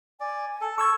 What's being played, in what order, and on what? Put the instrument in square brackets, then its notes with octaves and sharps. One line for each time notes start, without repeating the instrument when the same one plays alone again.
[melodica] D5 [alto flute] G#5
[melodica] A4
[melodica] A4 [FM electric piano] C#6 E6 G#6